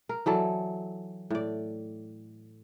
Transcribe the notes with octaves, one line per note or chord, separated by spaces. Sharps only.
A#4
E3 F#3 A4 D5
A2 D5